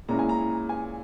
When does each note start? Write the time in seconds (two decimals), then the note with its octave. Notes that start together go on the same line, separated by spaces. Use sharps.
0.08 A#2 G#3 C#4 E4 A#5
0.19 G#5
0.29 A#5
0.69 G#5